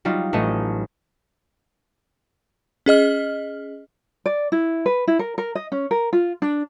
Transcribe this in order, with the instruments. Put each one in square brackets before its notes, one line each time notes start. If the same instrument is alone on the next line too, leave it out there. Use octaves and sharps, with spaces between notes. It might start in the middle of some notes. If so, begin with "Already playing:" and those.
[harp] F#3 G3 D#4 F4
A1 A3 D#5
[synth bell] C#4 G#4 D#5 F6
[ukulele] D5
E4
B4
E4
A#4
A#4
D#5
C#4
A#4
F4
D4